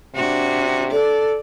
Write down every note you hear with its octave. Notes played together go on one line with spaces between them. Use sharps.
C3 D4 F#4
A4 D5